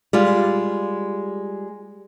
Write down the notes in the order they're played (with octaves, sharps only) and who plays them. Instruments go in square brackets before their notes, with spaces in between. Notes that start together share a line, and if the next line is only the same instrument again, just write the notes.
[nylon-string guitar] G3 G#3 F4